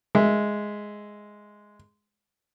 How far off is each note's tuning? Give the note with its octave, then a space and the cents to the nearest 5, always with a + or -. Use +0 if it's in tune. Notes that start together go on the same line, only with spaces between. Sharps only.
G#3 +0 E5 +0